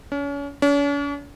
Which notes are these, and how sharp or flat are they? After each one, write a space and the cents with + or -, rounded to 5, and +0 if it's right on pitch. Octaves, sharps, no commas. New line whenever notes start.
C#4 +35
C#4 +45